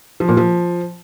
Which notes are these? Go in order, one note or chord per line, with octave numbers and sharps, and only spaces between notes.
F3
A#2
F3